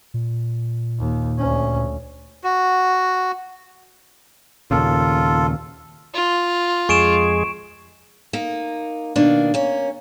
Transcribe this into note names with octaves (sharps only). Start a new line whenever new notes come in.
A#2
D#2
D2 C#4
F#4
D#2 A#2 C#3 F4 A4
F4
F2 G#3 G#4 C#6 D7 E7
A#3 D#4
B2 D#3 A#3 D4
A#3 C#4